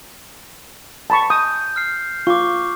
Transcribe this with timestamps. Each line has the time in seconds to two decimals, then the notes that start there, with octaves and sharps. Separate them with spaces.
1.10 A5 B5 C#6
1.30 D#6 G6
1.76 F6 C7
2.27 F4 C#6 D6